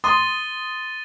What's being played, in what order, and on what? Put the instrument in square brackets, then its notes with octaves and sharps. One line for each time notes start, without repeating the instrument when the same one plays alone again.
[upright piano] C6 D#6 [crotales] A6 D#7 G7